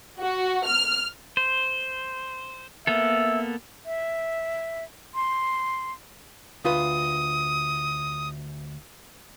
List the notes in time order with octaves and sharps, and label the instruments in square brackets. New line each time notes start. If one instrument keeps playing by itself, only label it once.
[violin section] F#4
F6
[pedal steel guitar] C5
[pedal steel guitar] A#3 B3 A4 [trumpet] E5
[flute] E5
C6
[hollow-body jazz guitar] D2 F4 B4 [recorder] D#6